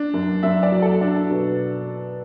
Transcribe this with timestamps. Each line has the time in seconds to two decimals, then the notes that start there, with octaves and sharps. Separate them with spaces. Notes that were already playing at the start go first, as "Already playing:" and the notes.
Already playing: D4
0.14 F#2
0.43 F#2 E5
0.63 D5
0.72 F#3
0.82 A4
1.01 D4
1.30 B2